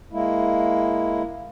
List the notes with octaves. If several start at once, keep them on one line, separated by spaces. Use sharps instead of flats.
G#3 A#3 E4